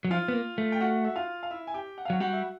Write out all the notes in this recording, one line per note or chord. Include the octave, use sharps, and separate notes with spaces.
F#3
F3 F4 F5
B3
A#3
A3
G5
F#4 F#5
E5
F4 F5
F5
E4 E5
G#5
G4 G5
F#5
F5
F#3 F#4 F#5
G3 F#4 F#5
E5